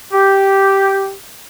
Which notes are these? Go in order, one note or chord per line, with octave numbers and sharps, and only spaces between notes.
G4